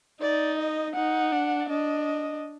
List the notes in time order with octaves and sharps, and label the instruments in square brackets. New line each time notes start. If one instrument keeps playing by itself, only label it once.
[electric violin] D#4 [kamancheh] D5
[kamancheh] D#5
[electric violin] D#4 [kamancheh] F#5
[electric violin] D4
[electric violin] D4 [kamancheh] D#5